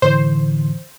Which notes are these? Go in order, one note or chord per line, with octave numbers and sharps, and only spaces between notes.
A2 D3 E3 C5